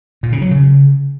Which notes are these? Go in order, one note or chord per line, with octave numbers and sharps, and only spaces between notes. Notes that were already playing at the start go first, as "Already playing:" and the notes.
A#2
C#3
F#3
C#3